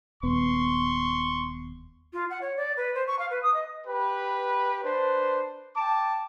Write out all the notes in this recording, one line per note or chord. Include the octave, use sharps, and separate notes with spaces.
D#1 B3 C6 C#6
F4
F#5
C#5
D5
B4
C5
C#6
F5
B4
D#6
D#5
G4 B4
D4 B4 C5
G5 A5 D6